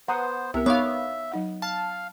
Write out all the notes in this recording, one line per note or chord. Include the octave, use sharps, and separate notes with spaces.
B3 B4 C5 F#5 A#5 C6 D#6
C2 B3 A#4 E5
B3 D#4 C#5 F5 D6
F#3 D#4 F#5
F5 A5